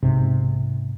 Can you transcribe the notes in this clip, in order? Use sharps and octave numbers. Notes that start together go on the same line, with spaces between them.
B1 G#2 C3